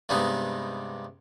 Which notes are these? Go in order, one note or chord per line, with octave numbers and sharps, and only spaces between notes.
G2 C3 G#3 B3 D#4